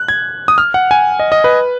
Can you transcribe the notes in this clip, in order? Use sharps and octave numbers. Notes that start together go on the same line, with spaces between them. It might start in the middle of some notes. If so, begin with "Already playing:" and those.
Already playing: F#6
G#6
D#6
F6
F#5
G#5
D#5
D#5
B4